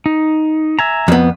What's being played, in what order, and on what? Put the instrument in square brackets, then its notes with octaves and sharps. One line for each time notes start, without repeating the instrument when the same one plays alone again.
[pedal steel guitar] D#4
E5 G#5 A#5
[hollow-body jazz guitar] F2 B3